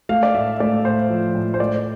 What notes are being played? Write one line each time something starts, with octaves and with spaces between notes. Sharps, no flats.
A3 F5
D5
A2 E5
A3 D5
A2 C5
F3
A2
C5
A3 D5